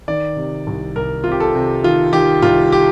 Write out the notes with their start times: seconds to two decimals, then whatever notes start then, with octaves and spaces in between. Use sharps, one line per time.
0.08 D#3 D5
0.36 C3
0.67 C2
0.96 C2 A#4
1.24 C3 F4
1.32 G4
1.40 A4
1.55 C3
1.84 D#3 F4
2.13 D#3 G4
2.42 C2 F4
2.72 G4